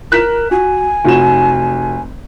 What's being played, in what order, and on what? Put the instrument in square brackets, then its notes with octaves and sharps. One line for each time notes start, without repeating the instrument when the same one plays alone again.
[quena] A#4 [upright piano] F#6 B6 E7
[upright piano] F#4 [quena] G#5
[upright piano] F1 F#4 E7